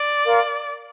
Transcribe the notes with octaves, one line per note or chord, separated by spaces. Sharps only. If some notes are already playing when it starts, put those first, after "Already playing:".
Already playing: D5
A#4 F5 C6